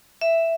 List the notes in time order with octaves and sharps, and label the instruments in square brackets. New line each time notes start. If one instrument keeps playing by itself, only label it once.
[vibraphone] E5